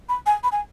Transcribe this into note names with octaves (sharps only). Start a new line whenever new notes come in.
B5
G#5
B5
G#5